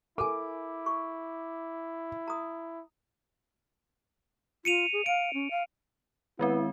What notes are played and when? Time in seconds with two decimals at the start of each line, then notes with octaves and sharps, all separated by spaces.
0.18 E4 A4 A#4 G#5 D6
0.86 C#6
2.28 A#5 D#6
4.65 F4 C#7 D#7 F7
4.93 G#4
5.06 F5 D7
5.34 C#4
5.51 F5
6.39 D#3 G#3 B3 C4 E4